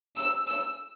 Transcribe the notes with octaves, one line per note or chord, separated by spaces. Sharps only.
E6
E6